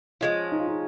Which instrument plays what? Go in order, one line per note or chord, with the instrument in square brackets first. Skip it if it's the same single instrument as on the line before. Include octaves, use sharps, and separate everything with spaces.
[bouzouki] F3 G#3 C#4 [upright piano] F4
[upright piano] D#4
F4
D#4